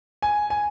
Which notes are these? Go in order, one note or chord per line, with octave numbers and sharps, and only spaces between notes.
G#5
G#5